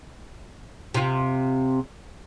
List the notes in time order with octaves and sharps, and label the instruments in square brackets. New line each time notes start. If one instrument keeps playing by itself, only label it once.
[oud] C3 F4